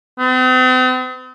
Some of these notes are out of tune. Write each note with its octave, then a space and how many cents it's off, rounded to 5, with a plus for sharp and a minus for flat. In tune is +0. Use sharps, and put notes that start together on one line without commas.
C4 -45